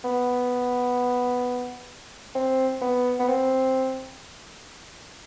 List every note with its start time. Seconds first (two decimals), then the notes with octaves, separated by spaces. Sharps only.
0.05 B3
2.35 C4
2.82 B3
3.19 B3
3.28 C4